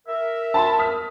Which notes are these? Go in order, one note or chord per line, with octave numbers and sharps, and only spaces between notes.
A#4 E5
A5 B5 C6
D#6 F6 B6